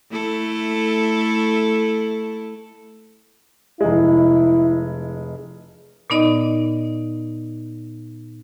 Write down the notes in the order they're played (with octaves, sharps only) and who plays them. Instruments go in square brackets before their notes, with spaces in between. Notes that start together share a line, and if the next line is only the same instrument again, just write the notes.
[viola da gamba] A3 E4 A4
[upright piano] F1 G#3 [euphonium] E4
[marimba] A#2 B3 D#4 D5 D#5